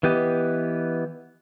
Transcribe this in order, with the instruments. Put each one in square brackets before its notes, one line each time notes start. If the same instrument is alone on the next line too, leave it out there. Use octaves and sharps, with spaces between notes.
[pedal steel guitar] E3 B3 G4 D#5